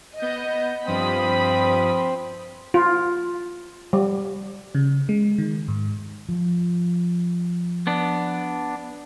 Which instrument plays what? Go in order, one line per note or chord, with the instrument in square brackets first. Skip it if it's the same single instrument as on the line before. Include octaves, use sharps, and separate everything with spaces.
[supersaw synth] B3 G6 [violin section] D#5
[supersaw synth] G2 F3 D#6 [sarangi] C4 [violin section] B5
[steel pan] F4
G3
[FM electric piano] C#3
G#3
D#3
G#2
[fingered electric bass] F3
[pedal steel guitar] B3 D4